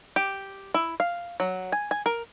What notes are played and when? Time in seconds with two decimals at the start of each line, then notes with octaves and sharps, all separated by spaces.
0.16 G4
0.74 E4
1.00 F5
1.40 F#3
1.72 G#5
1.91 G#5
2.06 A#4